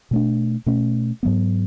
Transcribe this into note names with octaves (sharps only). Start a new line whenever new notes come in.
B2 A3 D4
B2 A3 C#4
G#2 F#3 B3